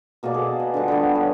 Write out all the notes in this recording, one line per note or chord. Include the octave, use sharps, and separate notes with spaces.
B2 A#3 G#4 D5
G#4 A4
B4 D#5
D3 F3 G3 D4
D3 G3 A3 B3
C#5